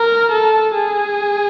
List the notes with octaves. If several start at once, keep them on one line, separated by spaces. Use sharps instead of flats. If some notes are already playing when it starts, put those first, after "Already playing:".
Already playing: A#4
A4
G#4